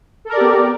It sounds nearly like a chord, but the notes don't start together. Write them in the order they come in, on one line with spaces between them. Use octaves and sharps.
A4 A#4 D5 G4 B3